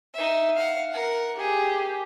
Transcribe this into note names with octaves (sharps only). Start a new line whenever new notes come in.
D#4 E5
F5 F#5
A#4 F#5
G4 G#4